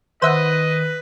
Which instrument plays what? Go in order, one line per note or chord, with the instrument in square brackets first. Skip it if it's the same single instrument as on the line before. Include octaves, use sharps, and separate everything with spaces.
[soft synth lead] D#3 [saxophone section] B4 [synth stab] C5 E5 F#5 [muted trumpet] D#5